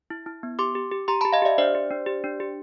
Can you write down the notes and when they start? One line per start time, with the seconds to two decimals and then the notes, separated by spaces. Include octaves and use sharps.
0.10 E4
0.26 E4
0.43 B3
0.59 G4 C6 D6
0.75 G4
0.91 G4
1.08 G4 A#5 C6
1.21 G4 A5 B5
1.33 D#5 F5
1.42 G4 D5 E5
1.58 D4 C5 D5
1.75 G4
1.91 D4
2.06 G4
2.24 D4
2.40 G4